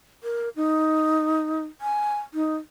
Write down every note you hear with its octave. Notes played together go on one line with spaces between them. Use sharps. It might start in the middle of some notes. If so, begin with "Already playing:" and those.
A#4
D#4
G#5
D#4